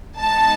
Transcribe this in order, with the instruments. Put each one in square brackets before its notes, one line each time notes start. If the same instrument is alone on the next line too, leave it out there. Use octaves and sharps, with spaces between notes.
[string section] G#2 E3 B3 D#4 A5